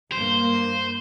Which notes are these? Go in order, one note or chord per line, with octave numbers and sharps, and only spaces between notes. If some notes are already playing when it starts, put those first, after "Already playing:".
G2 A#3 C5